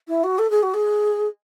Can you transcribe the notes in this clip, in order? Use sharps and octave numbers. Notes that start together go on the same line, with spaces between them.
E4
F#4
A4
G#4
F#4
G#4